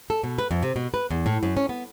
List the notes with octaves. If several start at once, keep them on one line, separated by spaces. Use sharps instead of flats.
A4
B2
B4
F2
C3
B2
B4
E2
A2
F#2
C#4
B3